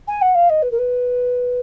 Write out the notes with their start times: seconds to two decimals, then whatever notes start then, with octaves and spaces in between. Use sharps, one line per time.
0.08 G#5
0.21 F#5
0.35 F5
0.49 D#5
0.62 B4
0.71 A#4
0.79 B4